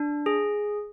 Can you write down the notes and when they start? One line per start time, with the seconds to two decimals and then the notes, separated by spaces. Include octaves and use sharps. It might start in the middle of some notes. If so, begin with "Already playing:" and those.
Already playing: D4
0.26 G#4